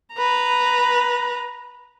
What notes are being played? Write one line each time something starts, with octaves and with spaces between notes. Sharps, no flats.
B4 A#5